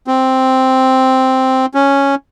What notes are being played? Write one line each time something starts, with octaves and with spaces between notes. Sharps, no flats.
C4
C#4